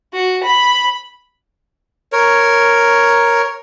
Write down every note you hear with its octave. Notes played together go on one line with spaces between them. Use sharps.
F#4
B5
A#4 C#5